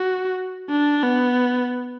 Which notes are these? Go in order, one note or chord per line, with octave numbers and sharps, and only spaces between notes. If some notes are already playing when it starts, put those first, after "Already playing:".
Already playing: F#4
D4
B3